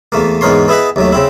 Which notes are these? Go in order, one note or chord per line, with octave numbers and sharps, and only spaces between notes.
E2 A3 A#3
E2 G#2 B3 A#4 C#5 C6
B3 E4 G#4 B4 D#5
D#2 F#3 A3
C#3 C4 E4